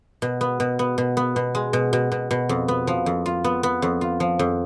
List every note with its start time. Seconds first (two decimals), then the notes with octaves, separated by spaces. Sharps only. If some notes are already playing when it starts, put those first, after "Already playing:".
0.22 B2
0.41 B3
0.60 B2
0.79 B3
0.98 B2
1.17 B3
1.36 B2
1.55 G#3
1.73 B2
1.93 B2
2.12 B2
2.31 B2
2.49 F2
2.68 B3
2.87 F3
3.06 F2
3.26 F4
3.44 B3
3.63 B3
3.82 F2
4.01 F4
4.20 F3
4.39 F2